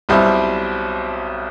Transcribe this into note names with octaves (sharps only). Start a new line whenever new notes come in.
B1 B2 G3 C4 E4